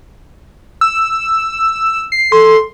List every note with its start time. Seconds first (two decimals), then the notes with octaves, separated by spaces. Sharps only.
0.81 E6
2.12 C7
2.32 A4 C6